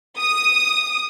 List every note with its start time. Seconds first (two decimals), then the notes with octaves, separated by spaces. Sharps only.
0.18 D#6